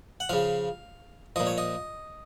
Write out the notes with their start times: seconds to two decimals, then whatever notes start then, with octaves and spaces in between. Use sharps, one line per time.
0.20 F#5
0.29 C#3 F3 F5
1.36 A#2 F3 D#5
1.47 C#5
1.58 D#5